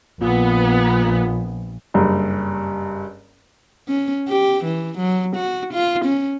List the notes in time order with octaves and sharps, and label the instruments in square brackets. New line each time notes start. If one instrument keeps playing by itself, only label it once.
[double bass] A#1 [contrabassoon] A#2 [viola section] B3
[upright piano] F#1 G2
[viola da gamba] C#4
G4
E3
F#3
F#4
F4
C#4